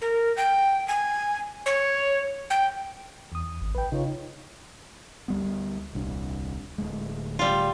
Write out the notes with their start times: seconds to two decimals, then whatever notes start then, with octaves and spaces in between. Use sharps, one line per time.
0.02 A#4
0.37 G5
0.88 G#5
1.66 C#5
2.50 G5
3.32 E2 D#6
3.61 G#1
3.75 A#1 B4 G5
3.92 C#3 D#4 F4 C#5
5.28 D2 G3 B3
5.93 D#1 C2 D4
6.78 D1 D2 G#3
7.39 G3 F4